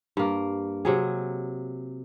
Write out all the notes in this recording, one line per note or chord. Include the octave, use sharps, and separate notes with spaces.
G2 A#3
C3 F#3 G#4